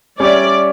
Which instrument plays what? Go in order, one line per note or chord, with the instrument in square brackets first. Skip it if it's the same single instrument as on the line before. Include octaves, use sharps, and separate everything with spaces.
[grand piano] G3 C#4 G4 C#5 E5 [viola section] D5